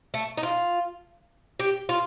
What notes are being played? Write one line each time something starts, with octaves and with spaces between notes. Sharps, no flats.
A3
D#4
F4
G4
F4